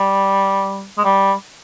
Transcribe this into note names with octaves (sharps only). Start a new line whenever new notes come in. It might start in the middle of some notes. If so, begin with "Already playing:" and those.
Already playing: G3
G#3
G3